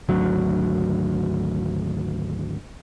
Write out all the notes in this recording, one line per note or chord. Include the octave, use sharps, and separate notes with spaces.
G#1 D2 F#3